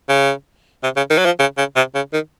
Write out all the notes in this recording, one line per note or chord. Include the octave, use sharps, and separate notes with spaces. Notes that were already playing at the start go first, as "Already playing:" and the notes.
C#3
C3
C#3
D#3
F#3
F3
C#3
C#3
C3
C#3
D#3